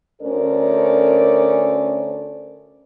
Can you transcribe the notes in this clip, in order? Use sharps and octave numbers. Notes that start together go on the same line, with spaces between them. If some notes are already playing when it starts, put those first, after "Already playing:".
D2 C#4 A4 A#4 C5 D5